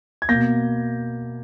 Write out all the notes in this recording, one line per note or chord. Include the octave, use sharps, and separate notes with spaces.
G#6
B2 A#3 G6 A#6